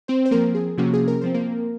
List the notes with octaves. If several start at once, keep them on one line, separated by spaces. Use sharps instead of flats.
C4 C5
C5
F3 A#3 C4 A#4
G#4
C3 F3 A#3 C#4 F#4
G#4
A#4
F3 C4 C5
A#3 A#4